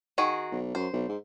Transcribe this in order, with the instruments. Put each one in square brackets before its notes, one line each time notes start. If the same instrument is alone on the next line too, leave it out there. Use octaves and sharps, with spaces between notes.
[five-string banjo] D#3 F#4 G#4
[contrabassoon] B1
[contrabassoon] F#2 [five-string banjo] C5
[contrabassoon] B1
G#2